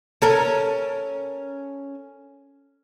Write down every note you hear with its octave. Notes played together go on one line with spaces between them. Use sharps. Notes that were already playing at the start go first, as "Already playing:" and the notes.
C#4 A4 A#4